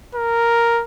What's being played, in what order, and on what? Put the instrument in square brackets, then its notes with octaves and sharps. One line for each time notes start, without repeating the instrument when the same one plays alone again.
[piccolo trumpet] A#4